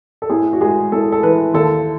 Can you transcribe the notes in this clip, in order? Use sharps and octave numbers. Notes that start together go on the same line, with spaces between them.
A4
A2 G#4
F#4
G#3 G#4
A2 A4
A4
E3 B4
D#2 A4